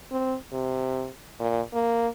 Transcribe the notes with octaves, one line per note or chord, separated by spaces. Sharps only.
C4
C3
A#2
A#3